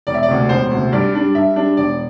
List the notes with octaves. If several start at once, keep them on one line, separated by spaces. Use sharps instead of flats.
E1 D5
E5
D5
D2 C3
E1 C5
D2 C3
G2 D5
G3 D4
G2 E5
G3 D4
E1 D5